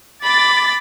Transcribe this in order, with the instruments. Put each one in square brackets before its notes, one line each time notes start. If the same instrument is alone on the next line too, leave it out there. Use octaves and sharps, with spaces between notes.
[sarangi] B5 [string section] D6 A6